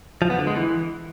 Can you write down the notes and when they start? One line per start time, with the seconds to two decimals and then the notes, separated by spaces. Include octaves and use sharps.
0.22 F3
0.30 B3
0.39 D3
0.47 G#3
0.55 E3